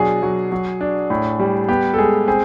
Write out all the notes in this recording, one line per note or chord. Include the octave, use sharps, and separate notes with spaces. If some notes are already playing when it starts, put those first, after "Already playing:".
Already playing: B2 F#3 D4 G#4
F#3
F#3
D4
A2
G3
B3 G4
A4
G#3 G#4
C4 G#4